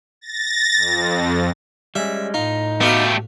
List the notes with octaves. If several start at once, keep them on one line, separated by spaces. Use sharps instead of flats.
A6 A#6
F2
G3 G#3 C#4 E5
A2 D#4 F4
A3 B3 F#4 G4 F5